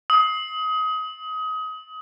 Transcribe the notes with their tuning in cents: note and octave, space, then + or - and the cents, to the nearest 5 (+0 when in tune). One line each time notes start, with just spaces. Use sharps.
D#6 +25